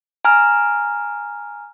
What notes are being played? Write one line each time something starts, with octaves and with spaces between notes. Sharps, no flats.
G#5 A#5 F6